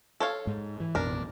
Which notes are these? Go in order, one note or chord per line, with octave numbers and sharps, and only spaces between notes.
A4 C#5 F5
G#2 G#3
E3
A1 F2 B2 D4 A#4